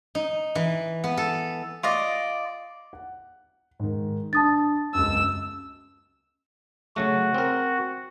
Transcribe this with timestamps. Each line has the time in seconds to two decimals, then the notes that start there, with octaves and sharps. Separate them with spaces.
0.15 D#4
0.55 E3
1.04 B3
1.17 A4
1.83 F4 D5 D#5
2.93 F#5
3.79 G#2 D#3
4.33 D4 A5 D#6 A6
4.95 C#2 F#2 E6
6.96 C#3 F#3 A3 F#4
7.34 C4 A#4